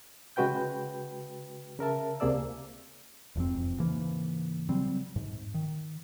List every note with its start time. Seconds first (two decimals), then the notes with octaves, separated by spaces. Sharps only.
0.36 C#3 G#3 F#4 B4 G5 G6
1.79 C#3 A#4 E5 A5
2.20 C#2 C3 A#3 G#4 D5 E6
3.36 E1 F2 G#2 C4
3.80 G#2 C#3 E3 A#3
4.69 C#3 F#3 G3 C4
5.16 G#2
5.54 D#3